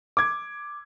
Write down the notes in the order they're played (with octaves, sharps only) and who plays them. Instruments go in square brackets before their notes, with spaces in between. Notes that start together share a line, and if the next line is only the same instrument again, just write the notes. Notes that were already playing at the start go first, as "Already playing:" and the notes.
[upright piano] D6 G#6